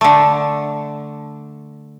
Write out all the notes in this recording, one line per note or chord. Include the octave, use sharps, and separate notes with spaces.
D3 A3